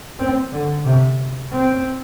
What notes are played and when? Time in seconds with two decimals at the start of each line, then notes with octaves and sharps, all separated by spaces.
0.19 C4
0.52 D3
0.85 C3
1.52 C4